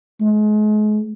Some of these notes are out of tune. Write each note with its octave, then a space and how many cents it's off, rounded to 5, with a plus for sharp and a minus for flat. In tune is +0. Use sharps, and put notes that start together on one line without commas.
G#3 +35